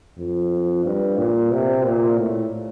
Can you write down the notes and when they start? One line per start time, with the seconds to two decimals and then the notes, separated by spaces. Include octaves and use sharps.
0.18 F2
0.85 G2
1.18 A#2
1.52 C3
1.84 A#2
2.18 A2